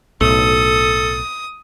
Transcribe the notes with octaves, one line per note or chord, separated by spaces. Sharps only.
B1 A2 A4 D#6